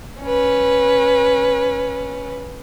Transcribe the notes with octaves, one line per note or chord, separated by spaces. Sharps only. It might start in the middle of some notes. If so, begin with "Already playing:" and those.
C#4 B4